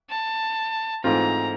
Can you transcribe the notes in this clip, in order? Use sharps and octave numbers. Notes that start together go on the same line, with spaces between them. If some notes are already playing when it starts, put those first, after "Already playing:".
A5
G#2 E3 A3 C4 F4 A#5